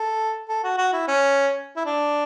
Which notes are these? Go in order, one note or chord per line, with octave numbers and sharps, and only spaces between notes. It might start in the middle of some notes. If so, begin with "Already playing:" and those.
Already playing: A4
A4
F#4
F#4
E4
C#4
E4
D4